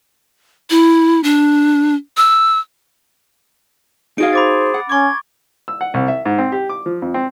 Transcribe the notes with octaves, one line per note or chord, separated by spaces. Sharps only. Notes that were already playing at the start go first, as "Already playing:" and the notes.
E4
D4
E6
D#4 F#4 G#4 F5 D7
C5 B5 D6 A6
F#5
C#4 C#6 D6 G#6
E6
F#5
C2
E5
G#2
C4
G4
D6
F3
F2
C4